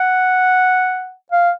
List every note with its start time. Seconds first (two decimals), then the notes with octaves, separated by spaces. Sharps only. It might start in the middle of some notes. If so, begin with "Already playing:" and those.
Already playing: F#5
1.32 F5